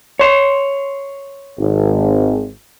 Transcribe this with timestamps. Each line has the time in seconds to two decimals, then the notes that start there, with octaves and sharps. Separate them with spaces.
0.19 C#5 C6
1.59 G#1